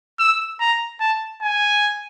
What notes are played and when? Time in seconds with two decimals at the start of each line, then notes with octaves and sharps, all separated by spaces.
0.19 E6
0.60 A#5
1.00 A5
1.42 G#5